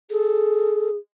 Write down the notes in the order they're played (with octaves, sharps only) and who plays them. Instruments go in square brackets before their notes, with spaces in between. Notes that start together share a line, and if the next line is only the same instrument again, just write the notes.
[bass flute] G#4 [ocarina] A4